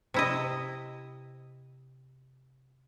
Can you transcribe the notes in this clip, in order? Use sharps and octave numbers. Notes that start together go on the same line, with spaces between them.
C3 E4 D#5